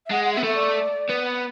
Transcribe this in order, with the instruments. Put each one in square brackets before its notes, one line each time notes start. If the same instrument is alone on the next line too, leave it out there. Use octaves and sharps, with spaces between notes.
[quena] E5
[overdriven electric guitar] G#3 [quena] F#5
[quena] F#5
E5
[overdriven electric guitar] B3
[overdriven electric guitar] A3 [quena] E5
[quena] D5
[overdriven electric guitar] B3